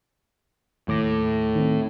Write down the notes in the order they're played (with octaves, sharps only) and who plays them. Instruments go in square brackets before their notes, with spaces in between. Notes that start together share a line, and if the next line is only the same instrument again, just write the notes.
[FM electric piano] D#2 D6 A#6 [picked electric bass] A2
[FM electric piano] D#3 C4